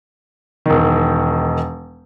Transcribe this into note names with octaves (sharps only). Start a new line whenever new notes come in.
E1 D#3